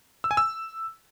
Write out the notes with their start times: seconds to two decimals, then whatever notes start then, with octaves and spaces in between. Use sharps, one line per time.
0.24 E6
0.31 G#5
0.37 E6